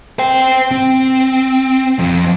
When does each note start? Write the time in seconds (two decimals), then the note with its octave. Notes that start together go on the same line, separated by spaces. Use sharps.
0.19 C5 G5
0.71 C4
1.99 F2